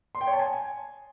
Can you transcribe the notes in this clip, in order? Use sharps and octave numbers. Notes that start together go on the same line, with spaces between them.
C6
G5
C#5
A5
G#5